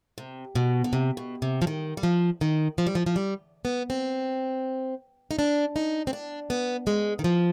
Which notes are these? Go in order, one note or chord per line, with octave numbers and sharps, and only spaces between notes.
C3
B2
D3
C3
B2
C3
F3
D#3
G3
F3
D#3
F3
G3
F3
F3
G3
B3
C4
D#4
D4
D#4
C4
D4
B3
G#3
D#3
F3